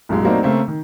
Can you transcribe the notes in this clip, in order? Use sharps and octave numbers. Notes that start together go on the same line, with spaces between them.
B1 F#2 A#2 G#3
F#3 A3 A#3 C4 D4 D#4
C#3 A3 A#3 C4
D#3